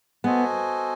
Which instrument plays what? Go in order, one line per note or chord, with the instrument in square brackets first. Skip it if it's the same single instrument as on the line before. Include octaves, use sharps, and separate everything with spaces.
[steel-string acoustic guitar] B3 [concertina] F#4 A4 C5 D#5 G#5